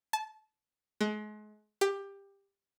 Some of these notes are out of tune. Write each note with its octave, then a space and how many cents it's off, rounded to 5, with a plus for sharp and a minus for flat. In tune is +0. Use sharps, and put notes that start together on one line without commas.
A5 -25
G#3 +35
G4 +15